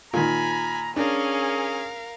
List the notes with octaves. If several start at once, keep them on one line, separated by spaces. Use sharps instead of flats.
A#2 D#3 G#5 A#5 B5
C#4 D4 G#4 A#4 F5